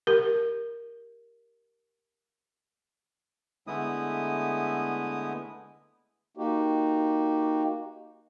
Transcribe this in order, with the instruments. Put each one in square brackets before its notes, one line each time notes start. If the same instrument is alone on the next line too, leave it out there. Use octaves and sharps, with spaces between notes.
[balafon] G4 A#4
[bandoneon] D3 G#3 A3 B3 E4 D#6
[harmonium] A#3 D#4 F#4 G4